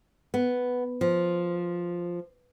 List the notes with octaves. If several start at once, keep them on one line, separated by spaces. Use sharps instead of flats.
B3
F3